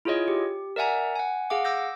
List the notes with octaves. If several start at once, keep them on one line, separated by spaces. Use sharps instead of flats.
E4 F4 G#4 C#5 D#5
G4
A#4 D5 E5 F#5 G#5 A#5
F#5 G#5
G#4 F5 F#5 D6
D6 E6 G6 A#6